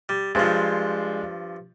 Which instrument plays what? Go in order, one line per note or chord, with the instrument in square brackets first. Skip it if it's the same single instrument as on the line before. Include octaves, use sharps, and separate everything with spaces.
[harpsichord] G3
[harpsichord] G2 F3 [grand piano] G#3 D4 C5